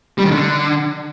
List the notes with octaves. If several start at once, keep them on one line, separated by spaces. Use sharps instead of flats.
G3
D#3
D3